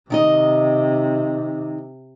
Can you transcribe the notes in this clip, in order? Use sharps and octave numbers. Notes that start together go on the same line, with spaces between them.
C3 D#3 D#4 D#5